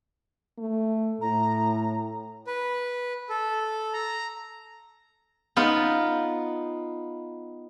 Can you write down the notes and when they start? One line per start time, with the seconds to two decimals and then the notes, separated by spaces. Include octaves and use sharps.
0.58 A3
1.21 A2 A#5
2.47 B4
3.29 A4
3.93 A#5
5.56 B3 D#4 F4